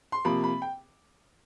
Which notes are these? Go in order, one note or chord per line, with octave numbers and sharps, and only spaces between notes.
C6
C3 F3 A#3 B5
B5
G5